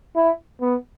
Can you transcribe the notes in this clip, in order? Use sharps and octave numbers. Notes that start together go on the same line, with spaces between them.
E4
B3